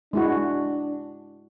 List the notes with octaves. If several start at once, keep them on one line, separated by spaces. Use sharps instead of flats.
G#3 D4 E4 F#4